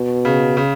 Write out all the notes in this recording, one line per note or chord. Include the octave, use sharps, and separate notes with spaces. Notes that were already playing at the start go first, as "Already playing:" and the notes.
Already playing: B2
C#3
C#3